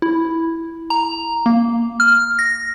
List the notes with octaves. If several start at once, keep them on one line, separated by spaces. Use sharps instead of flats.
E4
A#5
A#3
F6
A#6